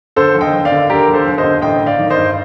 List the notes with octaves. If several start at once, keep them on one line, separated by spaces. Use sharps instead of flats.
D3 A4 C5
D#2
D#5 G5
D#2
D5 F5
D3
D3 G4 A#4
D#2
A4 C5
D#2
C5 D#5
D3
A1 D#5 G5
A1
D5 F5
D#3
C5 D#5
G2